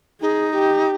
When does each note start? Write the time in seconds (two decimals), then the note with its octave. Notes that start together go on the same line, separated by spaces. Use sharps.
0.21 D#4 G#4
0.56 G4